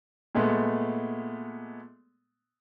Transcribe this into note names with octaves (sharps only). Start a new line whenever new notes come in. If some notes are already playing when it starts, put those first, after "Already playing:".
A#2 G#3 A3 B3